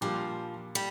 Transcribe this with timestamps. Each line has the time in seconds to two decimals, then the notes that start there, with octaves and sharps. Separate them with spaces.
0.01 A#2 F3 G3 D4 G4
0.75 G3